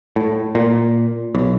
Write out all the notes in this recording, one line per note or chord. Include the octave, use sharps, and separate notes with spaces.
A2
A#2
B1